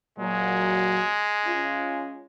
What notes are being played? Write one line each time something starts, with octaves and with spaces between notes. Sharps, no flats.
A#2 F#3 G#3
C#4 F4